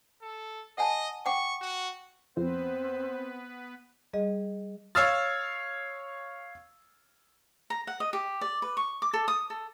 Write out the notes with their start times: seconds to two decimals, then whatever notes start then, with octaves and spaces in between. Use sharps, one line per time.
0.22 A4
0.78 D#5 F#5 G#5 A5
1.26 F#5 G5 C#6 D6
1.61 F#4
2.37 F2 B3 C4 B4 C5
4.13 G3 G#4 D#5
4.95 C#5 F5 E6 F6 A6
7.70 A#5
7.87 F#5
8.00 D#5
8.13 G4
8.41 D5
8.62 B4
8.77 C#6
9.02 D6
9.13 A4
9.28 D#6
9.50 A4